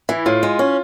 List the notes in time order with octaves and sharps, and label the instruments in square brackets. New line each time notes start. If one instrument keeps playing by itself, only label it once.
[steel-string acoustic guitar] E3 [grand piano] E4
[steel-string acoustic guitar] A2 [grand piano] F4
[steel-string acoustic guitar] G#3
C#4